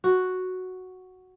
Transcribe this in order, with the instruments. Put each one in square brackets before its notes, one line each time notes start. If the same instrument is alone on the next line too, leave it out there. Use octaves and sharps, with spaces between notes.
[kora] F#4